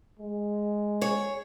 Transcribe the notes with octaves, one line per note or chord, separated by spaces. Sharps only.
G#3
G#4 C#5